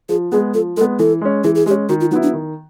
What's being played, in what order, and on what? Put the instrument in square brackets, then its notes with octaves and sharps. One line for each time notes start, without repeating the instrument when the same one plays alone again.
[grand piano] F3 [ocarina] G#4
[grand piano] G#3 B3 [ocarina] G#4
[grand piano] F3 [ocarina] A4
[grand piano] G#3 B3 [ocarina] A4
[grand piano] E3 [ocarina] A4
[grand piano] G#3 C#4
[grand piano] E3 [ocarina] G#4
[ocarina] G#4
[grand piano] G#3 [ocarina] G4
[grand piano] C#4
[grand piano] D#3 [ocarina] F#4
[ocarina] F4
[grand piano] F#3 B3 E4 [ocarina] D#4
[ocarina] D4
[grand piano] D#3